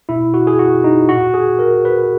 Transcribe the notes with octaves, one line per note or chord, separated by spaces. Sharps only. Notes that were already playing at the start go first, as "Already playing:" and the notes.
B2 E4
F#4
G#4
F#4
D#4
A#2 F#4
G#4
A#4
B4